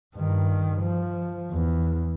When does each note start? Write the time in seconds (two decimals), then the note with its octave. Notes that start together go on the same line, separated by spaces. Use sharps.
0.15 G2 D#3
0.81 F3
1.51 E2